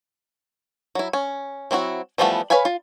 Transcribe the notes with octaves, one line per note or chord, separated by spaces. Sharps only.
F#3 E4
C#4
F#3 C4 E4 F#4
E3 F3 G3 A3 B3
B4 C#5 F5 G#5 B5
F4